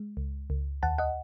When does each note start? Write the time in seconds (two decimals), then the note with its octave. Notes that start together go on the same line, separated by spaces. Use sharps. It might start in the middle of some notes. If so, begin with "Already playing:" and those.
Already playing: G#3
0.17 C#2
0.50 C#2
0.83 D#2 F#5 A5
0.98 D#5 F#5